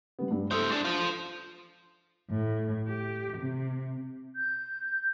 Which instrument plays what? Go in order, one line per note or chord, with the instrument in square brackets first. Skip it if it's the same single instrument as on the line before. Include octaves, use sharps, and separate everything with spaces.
[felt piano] G3 B3
G2 G3
[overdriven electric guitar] E4 C5 [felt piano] A4 D#6
[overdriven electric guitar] G#2 D4
F4 C5
[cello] A2
G4
C3
[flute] G6